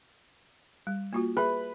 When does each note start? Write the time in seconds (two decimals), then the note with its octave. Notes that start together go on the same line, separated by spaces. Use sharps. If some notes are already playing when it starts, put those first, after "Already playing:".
0.87 G3
1.13 A#3 F4 F#4
1.37 G#4 B4 E5